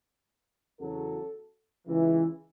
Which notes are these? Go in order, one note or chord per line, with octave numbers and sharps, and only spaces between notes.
E2 C#3 F#3 F#4 A4
C#2 C#3 E3